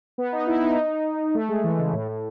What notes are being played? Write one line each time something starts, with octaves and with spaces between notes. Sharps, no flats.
B3
D#4
E4
D#4
A3
G#3
E3
C#3
A2
A2